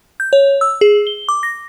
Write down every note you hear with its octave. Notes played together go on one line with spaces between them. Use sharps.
G6
C#5
E6
G#4
G7
D6
A#6